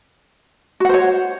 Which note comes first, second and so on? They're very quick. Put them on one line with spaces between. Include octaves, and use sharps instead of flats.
F#4 F#5 C5 C#5